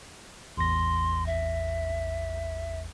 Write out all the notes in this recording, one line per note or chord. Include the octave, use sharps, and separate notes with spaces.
A1 E2 C6 A#6
E5